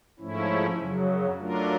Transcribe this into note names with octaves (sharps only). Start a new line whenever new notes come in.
G#2 F3 A3 C#4 E4
F#2 C#3 F#3
F#3 A3 D4 F4 A#4